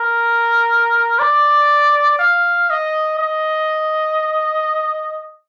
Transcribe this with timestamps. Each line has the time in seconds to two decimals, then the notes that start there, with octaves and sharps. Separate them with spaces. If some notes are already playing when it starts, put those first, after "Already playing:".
Already playing: A#4
1.19 D5
2.19 F5
2.70 D#5
3.19 D#5